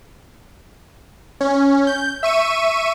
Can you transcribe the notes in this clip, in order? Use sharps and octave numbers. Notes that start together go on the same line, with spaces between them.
C#4
G6
E5 C#6 D#7